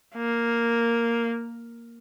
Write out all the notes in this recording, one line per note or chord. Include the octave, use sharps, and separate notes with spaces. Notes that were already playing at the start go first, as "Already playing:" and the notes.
A#3